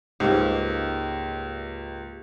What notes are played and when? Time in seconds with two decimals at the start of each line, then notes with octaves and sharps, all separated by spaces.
0.20 C#2 G#2 A#3 G4